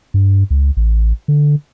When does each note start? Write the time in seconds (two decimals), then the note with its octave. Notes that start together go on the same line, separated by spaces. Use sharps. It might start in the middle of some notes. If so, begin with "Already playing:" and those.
0.14 G2
0.50 C#2
0.77 A1
1.28 D3